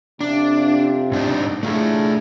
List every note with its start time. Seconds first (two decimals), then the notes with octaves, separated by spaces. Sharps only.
0.21 F2 C3 D4
1.12 G#2 D4 D#4
1.63 A2 A3 D4 F4 G#4 A4